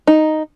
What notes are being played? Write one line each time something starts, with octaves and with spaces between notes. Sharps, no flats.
D#4